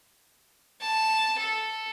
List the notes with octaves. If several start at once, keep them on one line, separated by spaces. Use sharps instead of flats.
A5
A4